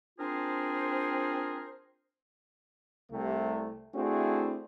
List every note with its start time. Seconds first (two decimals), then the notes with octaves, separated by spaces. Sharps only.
0.19 C4 D4 F4 G#4 A#4 C5
3.11 C2 C3 A3
3.94 A3 C4 D4 E4 F#4 G#4